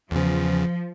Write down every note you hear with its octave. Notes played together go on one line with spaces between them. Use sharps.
E2 C#3 F3